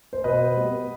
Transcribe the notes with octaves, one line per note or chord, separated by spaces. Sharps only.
C5
B2 B4 D#5
G3 B3